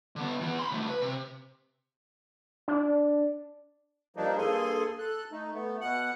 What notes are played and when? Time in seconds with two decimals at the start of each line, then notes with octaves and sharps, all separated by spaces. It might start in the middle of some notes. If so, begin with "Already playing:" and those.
0.16 D3 B3
0.41 E3 B3
0.59 B5 C6
0.71 C#3 A3
0.88 B4
1.02 C3
2.68 D4
4.16 G2 F3 G3 A#3 D4 D#4
4.38 G2 A#3 G#4 A4 G#5 C6
4.99 A4 F#6
5.32 A3 D#4
5.54 A3 B3
5.81 B2 F#5 F#6